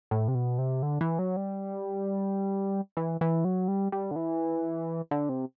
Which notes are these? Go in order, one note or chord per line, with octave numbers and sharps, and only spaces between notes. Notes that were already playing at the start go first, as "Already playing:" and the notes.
A2
C3
B2
C3
D3
E3
F#3
G3
E3
E3
F#3
G3
G3
D3
E3
D3
C3